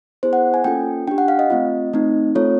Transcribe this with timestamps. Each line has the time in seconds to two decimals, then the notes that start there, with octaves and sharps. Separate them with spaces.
0.23 B3 E4 G#4 C5
0.33 F#5
0.54 G#5
0.64 A#3 C#4 F4 A4 G5
1.08 D4 G4 G5
1.18 F#5
1.28 F5
1.39 D#5
1.50 A3 C4 F4
1.93 A3 C4 D#4
2.35 A3 C4 F4 A4 C#5